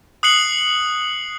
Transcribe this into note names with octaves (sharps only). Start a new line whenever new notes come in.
D#6 F#6 C7 C#7 F#7